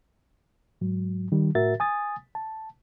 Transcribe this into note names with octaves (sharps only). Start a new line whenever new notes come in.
G#2 F#3
D#3 G3
A2 F#4 A#4 E5 A6
G#5 D#6 A6
A5